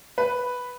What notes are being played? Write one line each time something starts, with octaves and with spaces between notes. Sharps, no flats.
B4